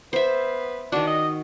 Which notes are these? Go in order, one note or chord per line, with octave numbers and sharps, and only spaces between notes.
B3 C5 E5
D#3 D4 F#4
D#5